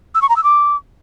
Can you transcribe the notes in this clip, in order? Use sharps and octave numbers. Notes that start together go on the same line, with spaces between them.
E6
C#6
A#5
E6
D6